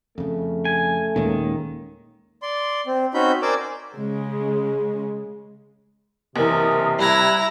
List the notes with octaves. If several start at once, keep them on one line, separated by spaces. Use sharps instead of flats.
F2 C#3 A3
G#5
D#1 D#2 A#2 D#3 G#3 A#3 C#4
D5 C6
C4
C4 C#4 D#4 F#4 B5 G6
A#4 C5 D5 G#5 D6 E6
C#3 G#3
F#1 C3 E3 A#4 D#6
G3 E4 A#5 F#6 G#6